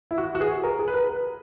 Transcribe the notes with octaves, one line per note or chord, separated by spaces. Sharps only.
E4
F#4
F#4
G#4
A#4
G#4
B4
A#4
B4